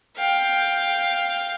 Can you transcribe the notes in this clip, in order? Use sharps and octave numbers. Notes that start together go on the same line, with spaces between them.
F5 G5